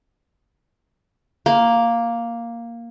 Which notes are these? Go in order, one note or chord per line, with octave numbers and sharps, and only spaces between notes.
A#3